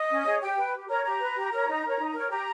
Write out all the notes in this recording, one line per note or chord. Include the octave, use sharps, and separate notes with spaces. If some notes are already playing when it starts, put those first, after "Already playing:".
Already playing: D#5
C#4
G#4 C#5
G4 G5
B4
G4
A#4 C#5 A#5
G4 A#5
B4
G4
A#4 C#5
D#4
A#4 C#5
D#4
A#4 C#5
G4 A#5